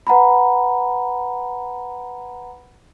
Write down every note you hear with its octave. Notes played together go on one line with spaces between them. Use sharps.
B4 F#5 A#5 B5